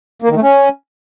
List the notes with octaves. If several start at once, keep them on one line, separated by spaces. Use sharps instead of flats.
A#3
D#3
A3
C#4